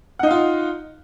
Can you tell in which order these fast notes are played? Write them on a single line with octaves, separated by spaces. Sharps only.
F#5 D#4 F5 F4